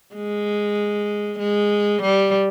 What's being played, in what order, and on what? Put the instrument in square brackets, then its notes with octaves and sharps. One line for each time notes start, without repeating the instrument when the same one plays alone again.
[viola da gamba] G#3
G#3
G3